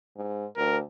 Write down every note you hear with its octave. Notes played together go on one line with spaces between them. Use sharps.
G#2
D2 A#4